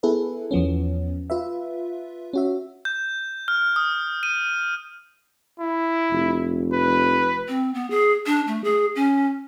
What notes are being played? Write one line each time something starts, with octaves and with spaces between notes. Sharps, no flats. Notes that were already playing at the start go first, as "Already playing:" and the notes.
B3 E4 G#4 A4 B4
E2 F3 B3 C#4
F4 B4 E5
C#4 F#4 E5
G6
F6
D#6
D#7
E4
F1
B4
C4
B3
G#4
D4
A3
G#4
C#4